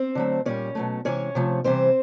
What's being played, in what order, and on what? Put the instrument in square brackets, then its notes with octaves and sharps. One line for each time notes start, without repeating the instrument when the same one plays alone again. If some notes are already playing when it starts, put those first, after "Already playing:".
Already playing: [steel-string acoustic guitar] C4 C5
D3 F#3 A3
A#2 G3 C#4 C#5
B2 F#3 A3
C3 E3 G#3 C#4 C#5
C3 F3 A3
C3 E3 G3 C4 C5